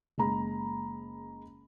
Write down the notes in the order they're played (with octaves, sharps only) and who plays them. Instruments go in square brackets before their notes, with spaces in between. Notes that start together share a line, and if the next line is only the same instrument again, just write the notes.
[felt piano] F#1 G#3 A#3 A#5 B5